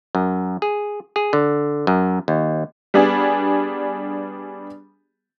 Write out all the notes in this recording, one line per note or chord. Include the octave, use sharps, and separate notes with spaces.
F#2
G#4
G#4
D3
F#2
D#2
G3 B3 D4 G#4